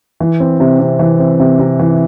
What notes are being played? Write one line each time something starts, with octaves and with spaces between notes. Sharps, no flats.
E3
C4
C3
C3
E3
C4
C3
C3
E3